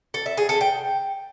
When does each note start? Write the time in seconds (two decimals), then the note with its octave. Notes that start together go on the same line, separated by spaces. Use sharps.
0.14 A4
0.26 E5
0.37 G#4
0.49 A4
0.61 G5